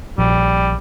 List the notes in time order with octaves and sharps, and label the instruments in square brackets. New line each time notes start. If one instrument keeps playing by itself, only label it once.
[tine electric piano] A#1 [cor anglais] G3